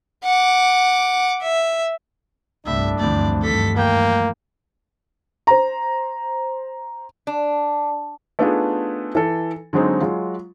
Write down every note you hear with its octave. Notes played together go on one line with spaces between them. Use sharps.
F#5 D6
E5
G1 C2 A2 D4 E5
D2 G2 E3 F3 A3 C4 D5
G2 D#3 A4 B6
A#3 G5
C5 A#5
D4
A3 B3 D4 D#4 F4 G#4
E3 A4
D3 F#3 G#3 C4 D#4
F#3 G#3 F4